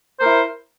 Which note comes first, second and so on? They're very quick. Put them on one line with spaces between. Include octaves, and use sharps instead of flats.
C5 A#4 E4